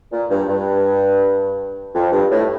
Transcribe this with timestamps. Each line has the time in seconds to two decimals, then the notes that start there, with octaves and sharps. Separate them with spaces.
0.11 A#2
0.30 G2
0.48 G2
1.95 F2
2.12 G2
2.31 A2